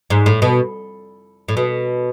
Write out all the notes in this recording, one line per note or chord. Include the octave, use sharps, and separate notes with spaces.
G#2
A2
B2
A2
B2